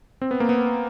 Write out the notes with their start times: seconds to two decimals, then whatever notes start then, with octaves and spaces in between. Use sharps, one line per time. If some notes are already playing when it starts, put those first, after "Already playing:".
0.22 C4
0.31 B3
0.40 A#3
0.49 B3